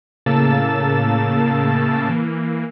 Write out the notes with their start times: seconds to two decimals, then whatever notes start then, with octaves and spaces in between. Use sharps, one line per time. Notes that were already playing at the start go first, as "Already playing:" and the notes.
0.26 A2 C#3 A#3 A5 E6 A6
2.09 E3 A#3